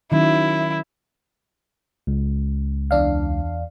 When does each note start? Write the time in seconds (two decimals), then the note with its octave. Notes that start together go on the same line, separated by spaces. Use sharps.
0.12 D#3 F#3 C#4 E4
2.07 C#2
2.91 E2 D4 F5